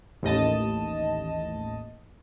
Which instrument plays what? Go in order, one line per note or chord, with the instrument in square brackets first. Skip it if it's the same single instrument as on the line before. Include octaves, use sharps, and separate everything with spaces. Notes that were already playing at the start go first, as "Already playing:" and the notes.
[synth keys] A1 D#2 D#5 A5